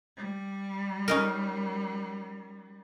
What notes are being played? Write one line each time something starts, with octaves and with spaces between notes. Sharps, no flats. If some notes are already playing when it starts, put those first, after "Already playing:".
G3
C#4 D#4 A#4